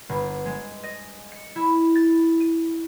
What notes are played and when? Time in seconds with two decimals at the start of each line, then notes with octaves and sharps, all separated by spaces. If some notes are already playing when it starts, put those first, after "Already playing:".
0.09 G1
0.45 G#3
0.83 D#5
1.32 C#7
1.56 E4
1.95 A6
2.40 D#7